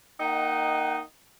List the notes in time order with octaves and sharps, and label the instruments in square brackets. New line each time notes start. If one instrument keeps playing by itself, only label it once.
[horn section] A#3 D#4 D#5 F#5 G5